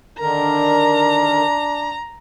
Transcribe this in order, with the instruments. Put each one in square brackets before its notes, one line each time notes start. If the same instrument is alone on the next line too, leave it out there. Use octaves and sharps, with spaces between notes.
[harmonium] D3 D#3 A#4 [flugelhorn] D4 [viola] A#5